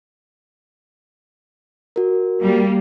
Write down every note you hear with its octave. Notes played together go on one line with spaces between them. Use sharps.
F#4 A#4
G3 A#3